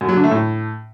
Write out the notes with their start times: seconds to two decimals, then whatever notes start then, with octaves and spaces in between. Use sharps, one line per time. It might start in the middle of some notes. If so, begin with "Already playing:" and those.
0.01 F#2
0.09 F#3
0.16 D3
0.24 A3
0.31 A2